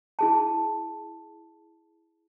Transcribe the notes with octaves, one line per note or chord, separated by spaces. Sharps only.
E4 G#4 A5